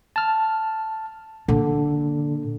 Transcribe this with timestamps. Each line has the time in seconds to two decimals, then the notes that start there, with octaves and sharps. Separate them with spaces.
0.16 A5 F6
1.48 A#2 D3